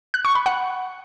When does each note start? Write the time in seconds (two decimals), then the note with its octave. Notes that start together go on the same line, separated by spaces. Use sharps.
0.14 F#6
0.25 C#6
0.35 B5
0.46 F#5